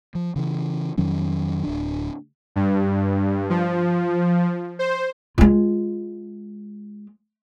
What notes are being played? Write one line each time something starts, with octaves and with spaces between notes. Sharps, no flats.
F3
C#3 E3
F2 D#3 F#3 C#4
D1 D4
G2
F3
C5
G#3 F4